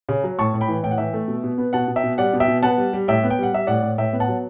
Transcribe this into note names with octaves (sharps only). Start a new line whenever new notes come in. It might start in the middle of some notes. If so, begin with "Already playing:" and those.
C#3
F#3
A2 A5 C#6
A2
G5 B5
E3
A2 G5
F#5
E3 E5 G5
A3
B2
B2
B3
B2 F#5 A5
B2
E5 G5
B2
G3 D5 F#5
B2
E5 G5
B2
B3 F#5 A5
G3
G3
A2 E5 G5
B3
G5
G3 F#5
G3 E5
A2 D5 F#5
A2
A2 E5 G5
B3
F#5 A5
F#3